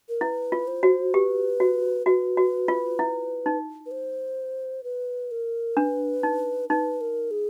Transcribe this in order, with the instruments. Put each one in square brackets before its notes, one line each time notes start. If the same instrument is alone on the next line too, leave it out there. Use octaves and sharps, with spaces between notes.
[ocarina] A#4
[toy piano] E4 [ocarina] B4
[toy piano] F4
[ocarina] C5
[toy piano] F#4
[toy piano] G4 [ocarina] B4
[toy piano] F#4
[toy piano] F#4 [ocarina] B4
[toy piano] F#4
F4
E4
D#4
[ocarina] B4
C5
B4
A#4
[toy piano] D4 [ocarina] B4
[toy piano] D#4
[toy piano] D#4 [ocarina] B4
[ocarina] A#4
G#4